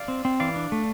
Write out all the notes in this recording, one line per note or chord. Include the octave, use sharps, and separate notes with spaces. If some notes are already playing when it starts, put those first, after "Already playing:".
Already playing: D5 F5
C4
C4
E3 D5 F5
D4
A3